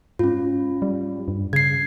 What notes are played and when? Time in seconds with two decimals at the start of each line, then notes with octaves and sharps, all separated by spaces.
0.19 G#2 C#4 F4
0.82 G3
1.28 G2
1.53 C#3 G#6 C7